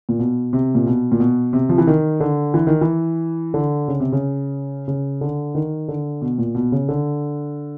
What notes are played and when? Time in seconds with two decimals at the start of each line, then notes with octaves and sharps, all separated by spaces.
0.09 A#2
0.19 B2
0.53 C3
0.75 A#2
0.86 B2
1.12 A#2
1.20 B2
1.53 C3
1.69 F3
1.78 E3
1.87 D#3
2.20 D3
2.54 E3
2.67 D#3
2.81 E3
3.54 D3
3.88 C#3
4.00 C3
4.13 C#3
4.88 C#3
5.21 D3
5.55 D#3
5.88 D3
6.22 B2
6.38 A#2
6.55 B2
6.72 C#3
6.89 D3